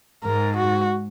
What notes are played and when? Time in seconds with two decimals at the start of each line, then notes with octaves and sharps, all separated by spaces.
0.24 G#2 A#4
0.57 F#4